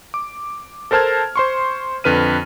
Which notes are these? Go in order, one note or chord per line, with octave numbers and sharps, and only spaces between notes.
D6
A4 A#4 C5 A5 F6 G#6
C5 C6 C#6
F2 D3 B4 F6 D#7